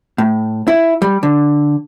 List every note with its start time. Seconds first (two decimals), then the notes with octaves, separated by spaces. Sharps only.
0.18 A2
0.68 E4
1.02 G3
1.23 D3